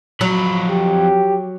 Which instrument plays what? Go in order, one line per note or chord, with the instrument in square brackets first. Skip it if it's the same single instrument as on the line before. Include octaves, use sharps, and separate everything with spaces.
[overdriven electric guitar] F2 B5 [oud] F#3
[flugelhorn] G4